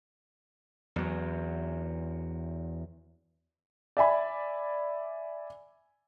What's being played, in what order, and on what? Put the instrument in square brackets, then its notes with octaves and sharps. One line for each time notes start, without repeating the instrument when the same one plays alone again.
[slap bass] E2 F#3
[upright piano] D5 E5 G#5 B5